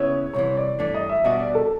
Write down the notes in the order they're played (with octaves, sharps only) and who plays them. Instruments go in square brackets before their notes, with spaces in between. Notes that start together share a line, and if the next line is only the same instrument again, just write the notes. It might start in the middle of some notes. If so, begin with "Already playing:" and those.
Already playing: [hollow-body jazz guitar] C#3 B3 E4 [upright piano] C#5
[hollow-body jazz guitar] C2 C3 E3 [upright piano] C#5
[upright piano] D5
[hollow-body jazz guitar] G2 E3 A3 D4 [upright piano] D5
[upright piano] D#5
E5
[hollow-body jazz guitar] B2 G3 B3 D4 F#4 [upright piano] D#5
[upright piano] D5
A4